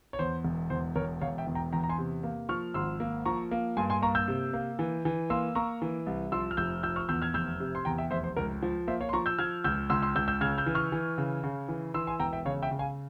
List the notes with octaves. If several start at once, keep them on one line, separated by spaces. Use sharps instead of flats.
C#5
E2 C5
E1
E2 C5
E1 A#4 C#5
E1 C#5 F5
E5 G5
E2
G5 A#5
E2 G5 A#5
A#5
G#5 C6
C3
A#3
F3 C#6 F6
G#1 C6 E6
A#3
F3 A#5 C#6
A#3
G2 G#5 C6
G#5 C6
A#3 A#5 C#6
E6 G6
C3
A#3
E3
E3
A#3 C6 E6
A#3 A#5 C#6
E3
C2
F3 C6 E6
F6
F1 E6 G6
F3 E6 G6
C#6 F6
E2 E6 G6
F6 G#6
F1 E6 G6
C3
C6
E2 G5 A#5
E5 G5
F1 C5 E5
C5
C#2 A#4
F3
A#3 C5 E5
C#5 F5
C6
F3 A#5 C#6
E6 G6
F3 F6 G#6
C#2 E6 G6
C#2 C6 E6
C6 E6
C#2 E6 G6
E6 G6
C#3 F6 G#6
E6 G6
E3
C#6 F6
E3
C#3
C#3
E3
E3 C6 E6
G#5 C6
E1 G5 A#5
E5 G5
C#3 C#5 F5
E5 G5
C#3
F5 G#5